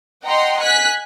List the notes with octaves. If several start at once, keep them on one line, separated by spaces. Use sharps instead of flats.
D#5 F#5 G5 A#5 C6
G#5 F#6 B6